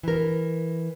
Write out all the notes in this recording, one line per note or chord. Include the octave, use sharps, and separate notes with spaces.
E3 A#4